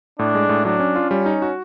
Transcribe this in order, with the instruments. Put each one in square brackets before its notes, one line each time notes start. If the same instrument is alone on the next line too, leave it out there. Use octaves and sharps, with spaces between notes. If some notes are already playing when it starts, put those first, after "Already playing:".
[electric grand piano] A2 [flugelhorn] D4
[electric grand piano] G#3
A2
[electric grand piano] F#3 [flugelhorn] D4
[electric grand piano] C#4
F4
[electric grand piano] G3 [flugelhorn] C#4
[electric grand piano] D#4
F#4